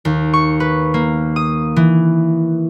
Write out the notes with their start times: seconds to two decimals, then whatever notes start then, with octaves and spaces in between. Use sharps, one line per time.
0.05 D#2
0.33 C#6
0.60 B4
0.94 A#3
1.36 D#6
1.76 E3